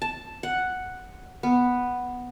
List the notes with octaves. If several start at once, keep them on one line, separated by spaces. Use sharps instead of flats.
A5
F#5
B3